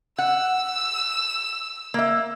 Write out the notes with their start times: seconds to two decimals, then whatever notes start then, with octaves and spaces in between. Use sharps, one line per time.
0.18 F#5 E6
1.94 A#3 E5